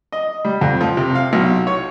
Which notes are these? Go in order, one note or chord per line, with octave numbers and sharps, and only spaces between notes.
D#5
G3
F2
F3
C3
F5
B1
C#5